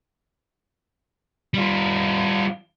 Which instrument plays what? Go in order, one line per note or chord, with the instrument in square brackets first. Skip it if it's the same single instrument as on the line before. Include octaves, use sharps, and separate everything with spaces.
[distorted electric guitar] G3 F4